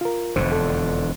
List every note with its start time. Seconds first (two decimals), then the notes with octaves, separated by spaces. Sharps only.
0.01 F4 A#4
0.36 E1 F2 D3 C5
0.52 A4